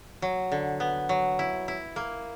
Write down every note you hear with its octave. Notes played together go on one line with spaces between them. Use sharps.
F#3
D3
B3
F#3
E4
E4
A#3